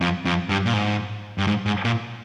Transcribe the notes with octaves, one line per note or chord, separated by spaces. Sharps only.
F2
F2
G2
A#2
G#2
G2
G#2
G#2
A#2